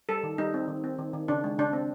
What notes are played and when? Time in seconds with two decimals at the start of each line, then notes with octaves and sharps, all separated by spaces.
0.09 G3 A4
0.23 D#3
0.38 G3 D#4
0.54 C4
0.68 D#3
0.84 C4
0.99 D#3
1.13 D#3
1.28 C#3 D4
1.44 G#3
1.58 C#3 D4
1.73 C4